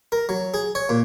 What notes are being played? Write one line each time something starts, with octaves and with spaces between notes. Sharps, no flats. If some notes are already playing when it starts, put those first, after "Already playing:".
A#4
F#3
G#4
C#5
A#2